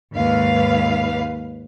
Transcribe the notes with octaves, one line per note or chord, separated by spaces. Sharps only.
D#2 G#2 G#3 B4 F5